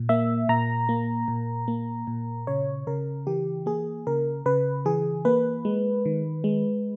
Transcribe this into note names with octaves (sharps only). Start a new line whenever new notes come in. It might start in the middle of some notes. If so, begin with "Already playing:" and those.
Already playing: A#2
A#3 E5
A#2 A#5
A#3
A#2
A#3
A#2
C#3 C#5
C#3 A#4
E3 G4
A#3 G#4
C#3 A#4
C#3 B4
E3 G#4
A#3 B4
G#3
D#3
G#3